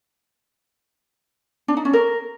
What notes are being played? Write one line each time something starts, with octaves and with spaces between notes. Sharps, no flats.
D4
D#4
C#4
A#4